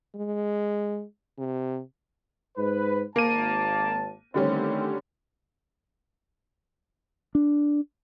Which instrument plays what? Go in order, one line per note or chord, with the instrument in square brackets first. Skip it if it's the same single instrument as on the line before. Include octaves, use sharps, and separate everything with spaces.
[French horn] G#3
C3
[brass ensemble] G#2 B4
[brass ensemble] G#1 A5 [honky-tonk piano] A#3 D#7
[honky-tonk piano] D3 G3 C#4 [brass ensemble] D#3 A3 C4
[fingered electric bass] D4